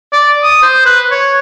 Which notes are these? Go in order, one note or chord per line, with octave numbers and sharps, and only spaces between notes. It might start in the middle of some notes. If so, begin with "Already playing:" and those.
D5
D#6
C5
B4
C#5